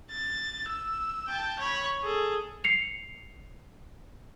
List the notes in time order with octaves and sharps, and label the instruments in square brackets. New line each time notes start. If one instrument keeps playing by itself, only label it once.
[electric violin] A6
E6
G5 A5
C#5 B5
G#4 A4
[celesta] C7 C#7 F7